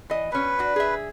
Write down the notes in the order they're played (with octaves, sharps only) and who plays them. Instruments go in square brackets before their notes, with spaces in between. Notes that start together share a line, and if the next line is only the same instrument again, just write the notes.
[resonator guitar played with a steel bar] E3 D#5
[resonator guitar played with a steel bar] B2 C#4 [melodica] B4
[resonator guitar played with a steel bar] D4 F#4
G#4 E5